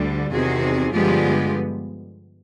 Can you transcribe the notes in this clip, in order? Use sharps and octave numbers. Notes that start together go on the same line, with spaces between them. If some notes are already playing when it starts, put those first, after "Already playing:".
Already playing: D2 D3 G3
E2 C3 D#3 F#4 G#4
G2 D3 F3 G#3 B3 F4 G4